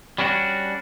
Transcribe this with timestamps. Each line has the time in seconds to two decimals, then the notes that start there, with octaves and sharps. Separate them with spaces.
0.18 G3 C#4 D4 F#4